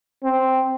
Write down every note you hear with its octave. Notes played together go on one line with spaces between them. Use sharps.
C4